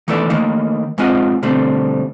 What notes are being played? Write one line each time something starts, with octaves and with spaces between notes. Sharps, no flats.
D#3 E3 A3 B3 A4 D5
D#3 A3 A#3 D#4
G#2 G#3 C4 F4 D#5 F#5
B2 D3 G3 A3 C4